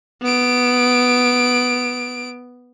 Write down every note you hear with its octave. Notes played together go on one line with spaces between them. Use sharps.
B3 D7